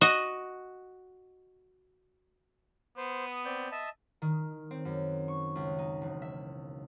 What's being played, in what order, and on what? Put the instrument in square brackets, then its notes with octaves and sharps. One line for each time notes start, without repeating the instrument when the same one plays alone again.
[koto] F#4 D#5
[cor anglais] B3 [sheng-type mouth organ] C5
[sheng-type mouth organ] D#6
C4 D5 G6
D#5 E5 A5
[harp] D#3
C4
F#2
C#6
C#2
D#4
E1
E5